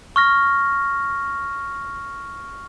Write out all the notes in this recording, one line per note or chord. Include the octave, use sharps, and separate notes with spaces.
C#6 F6 A#6